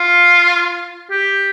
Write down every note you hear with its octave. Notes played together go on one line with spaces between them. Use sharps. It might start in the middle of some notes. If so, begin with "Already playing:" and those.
Already playing: F4
G4